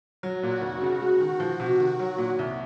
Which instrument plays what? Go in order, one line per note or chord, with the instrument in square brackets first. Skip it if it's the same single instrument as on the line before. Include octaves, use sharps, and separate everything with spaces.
[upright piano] F#3 [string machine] F#4
[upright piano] A#2
[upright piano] F1 [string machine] F#4
[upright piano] C#3
G#3
D#3
[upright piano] F3 [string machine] F#4
[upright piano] C3
D#3
F#3
A#2
C2